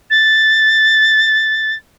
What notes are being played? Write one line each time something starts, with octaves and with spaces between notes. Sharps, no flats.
A6